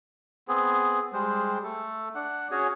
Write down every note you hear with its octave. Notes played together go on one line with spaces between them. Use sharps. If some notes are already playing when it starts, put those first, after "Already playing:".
B3 C4 G#4
G3 G#3 C5
A3 A4
D4 F#5
C#4 F#4 G#4 C#5